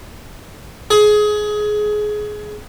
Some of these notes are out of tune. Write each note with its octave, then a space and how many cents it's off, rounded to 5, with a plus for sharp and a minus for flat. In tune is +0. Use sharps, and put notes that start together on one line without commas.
G#4 +20